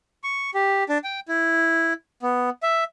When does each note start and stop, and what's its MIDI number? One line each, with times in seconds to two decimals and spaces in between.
0.24 0.50 85
0.54 0.84 67
0.89 0.98 62
1.04 1.20 79
1.28 1.93 64
2.22 2.50 59
2.63 2.84 76